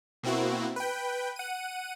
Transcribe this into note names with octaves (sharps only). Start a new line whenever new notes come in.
B2 A#3 C4 E4 F#4
B4 G5
F#5 D#7